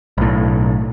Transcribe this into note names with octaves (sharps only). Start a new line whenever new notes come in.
B1 A2